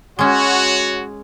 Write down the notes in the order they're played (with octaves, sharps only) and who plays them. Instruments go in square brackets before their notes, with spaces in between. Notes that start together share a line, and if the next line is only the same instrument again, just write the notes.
[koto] G#3 C#4 [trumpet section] F#4 C#5